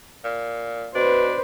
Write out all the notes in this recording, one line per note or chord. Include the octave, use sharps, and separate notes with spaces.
A#2
B2 D4 B4 C5